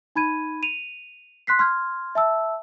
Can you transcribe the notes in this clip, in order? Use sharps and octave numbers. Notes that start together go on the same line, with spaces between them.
D#4 B5 G#6 D#7
D#7 F7
C6 F#6 B6 C7
C6 F6 G#6
E5 A5 E6